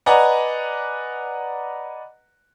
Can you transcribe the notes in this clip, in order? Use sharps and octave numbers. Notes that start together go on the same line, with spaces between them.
B4 D5 D#5 F#5 G#5 A#5